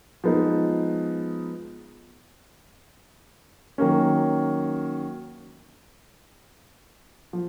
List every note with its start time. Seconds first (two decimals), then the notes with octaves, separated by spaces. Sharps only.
0.24 F3 G#3 B3 D#4
3.78 D#3 F#3 A#3 C#4
7.33 F3